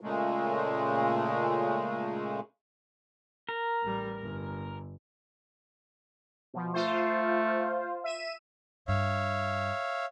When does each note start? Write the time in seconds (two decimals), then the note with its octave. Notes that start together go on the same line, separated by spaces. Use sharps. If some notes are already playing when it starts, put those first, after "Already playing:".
0.01 A#2 C#3 G#3 A3
3.49 A#4
3.83 A1 G3
4.21 G1
6.54 B2 F3
6.74 A3 F4 C5
8.04 E5 D#7 E7
8.88 G2 C#5 E5 F5